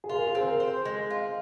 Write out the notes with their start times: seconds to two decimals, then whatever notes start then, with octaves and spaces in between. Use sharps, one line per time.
0.04 G#4
0.09 F4 A#4
0.27 G#4
0.35 C4 C5
0.43 A#4
0.60 C5
0.85 G#3
1.10 F4